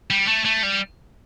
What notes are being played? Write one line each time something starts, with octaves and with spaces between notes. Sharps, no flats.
G3
A3
A3
G3